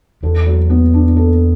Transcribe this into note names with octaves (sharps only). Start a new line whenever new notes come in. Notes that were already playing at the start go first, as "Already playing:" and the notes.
E2 A4
F#3
B3
D4
A4